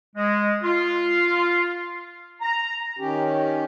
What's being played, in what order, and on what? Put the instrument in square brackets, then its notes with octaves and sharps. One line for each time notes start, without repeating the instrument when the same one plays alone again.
[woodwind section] G#3
F4
A#5
[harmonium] D#3 C#4 G4